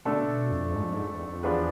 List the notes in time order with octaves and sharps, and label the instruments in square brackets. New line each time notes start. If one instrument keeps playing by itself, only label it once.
[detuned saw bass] B2 [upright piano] D3 A3 D4 A4
[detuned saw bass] B2
F2
G#2
F2
G#2
F2
E2
F2
[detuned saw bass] E2 [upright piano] F3 B3 D4 G#4 B4